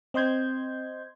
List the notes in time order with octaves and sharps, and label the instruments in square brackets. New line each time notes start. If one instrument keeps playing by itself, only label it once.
[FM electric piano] C4 D#5 C6 G6 G#6